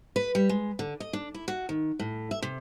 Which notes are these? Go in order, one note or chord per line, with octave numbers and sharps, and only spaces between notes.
B4
G3
G#3
D3
D#5
D4
E4
F#4
D#3
A2
E5
C3